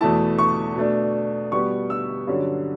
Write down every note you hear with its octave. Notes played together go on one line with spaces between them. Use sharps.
E2 B2 A3 E4 A5
C#6
B2 A3 D4
B2 G3 B3 C#6
E6
G2 D3 F#3 C#4